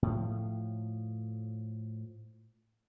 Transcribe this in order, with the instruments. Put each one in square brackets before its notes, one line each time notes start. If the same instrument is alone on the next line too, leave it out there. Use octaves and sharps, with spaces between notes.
[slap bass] A2 F3